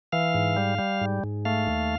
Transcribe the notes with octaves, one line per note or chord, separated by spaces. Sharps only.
E3 F5
G#2
G3
G3
G#2
G#2
A3 F5
D#2